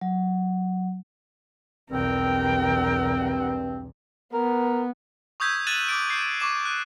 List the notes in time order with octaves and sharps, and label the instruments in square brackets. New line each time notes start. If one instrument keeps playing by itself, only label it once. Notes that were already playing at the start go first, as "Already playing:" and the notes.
[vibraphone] F#3
[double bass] B1 E2 [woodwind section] G2 C4 [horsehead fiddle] A#4 G5
[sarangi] B3 [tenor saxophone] A#4
[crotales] C#6 D#6 E6 G6 G#6 B6
F#6 A6 D#7 E7 F#7
D6 F#6 A6 D7
G6 C7
C#6 D6 E7
F#6